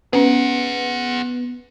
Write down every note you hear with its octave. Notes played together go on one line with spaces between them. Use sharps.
B3 C#4 G#4 B4 F#5